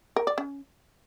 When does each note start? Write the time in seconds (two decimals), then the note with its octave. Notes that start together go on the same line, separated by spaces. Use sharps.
0.16 A#4
0.27 D5
0.38 C#4